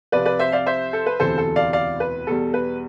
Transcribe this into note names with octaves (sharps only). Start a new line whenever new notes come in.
C2 C3 F3 B4 D5
B4 D5
C5 E5
D5 F5
C5 E5
A4
B4
E1 D2 C3 E3 A4 C5
A4
D5 F5
D5 F5
B4
E2 B2 G3 A4
B4